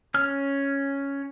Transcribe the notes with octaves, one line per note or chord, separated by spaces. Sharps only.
C#4 F6